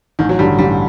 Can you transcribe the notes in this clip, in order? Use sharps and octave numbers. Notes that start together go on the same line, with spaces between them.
A1 D#3
F#3
G2 D3 G3
A1 G3